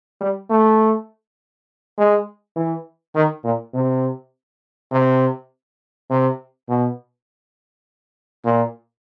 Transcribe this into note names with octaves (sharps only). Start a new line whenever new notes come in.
G3
A3
G#3
E3
D#3
A#2
C3
C3
C3
B2
A#2